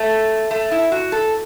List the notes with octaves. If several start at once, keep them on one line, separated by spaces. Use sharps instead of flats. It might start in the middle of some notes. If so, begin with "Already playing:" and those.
Already playing: A3
A3
E4
F#4
A4